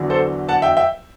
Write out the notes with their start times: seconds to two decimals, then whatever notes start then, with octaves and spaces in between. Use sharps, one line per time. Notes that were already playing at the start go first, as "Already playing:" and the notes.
Already playing: E2 D3 F#3
0.10 A4 C5
0.49 F#5 A5
0.62 E5 G5
0.77 E5 G5